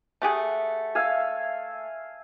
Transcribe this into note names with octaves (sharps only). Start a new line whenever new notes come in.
A3 G4 G#4 F#5
E5 F5 G#5